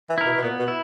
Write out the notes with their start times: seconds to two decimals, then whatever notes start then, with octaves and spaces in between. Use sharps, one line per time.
0.10 E3
0.18 E4 A#4
0.26 B2
0.37 B2
0.43 A#2 B3
0.59 B2
0.68 E4